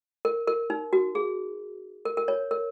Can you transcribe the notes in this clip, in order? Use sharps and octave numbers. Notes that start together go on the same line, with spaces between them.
A#4
A#4
D#4
F#4
G#4
A#4
A#4
C#5
A#4